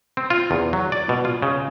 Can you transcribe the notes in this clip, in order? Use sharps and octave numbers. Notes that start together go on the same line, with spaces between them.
C4
F4
E2
F#3
D5
B2
F4
C#3